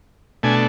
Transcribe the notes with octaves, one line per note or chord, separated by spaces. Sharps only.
B2 A3 D4 G#5